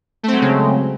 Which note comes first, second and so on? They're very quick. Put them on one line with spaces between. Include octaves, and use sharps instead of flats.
A3 C4 F#3 G#3 C#3